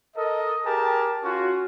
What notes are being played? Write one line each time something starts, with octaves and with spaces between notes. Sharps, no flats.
A4 A#4 D#5
G4 G#4 A#4 A5
C#4 F4 F#4